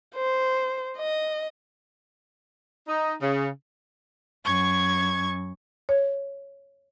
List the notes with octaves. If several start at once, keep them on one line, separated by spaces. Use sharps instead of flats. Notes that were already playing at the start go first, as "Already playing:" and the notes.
C5
D#5
D#4
C#3
F#2 C#6 G#6
C#5